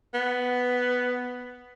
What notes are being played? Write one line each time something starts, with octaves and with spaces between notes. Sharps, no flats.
B3